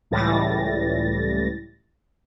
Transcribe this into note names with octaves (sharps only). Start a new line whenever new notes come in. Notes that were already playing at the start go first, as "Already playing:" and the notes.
C#2 A2 E3 G3 A6 A#6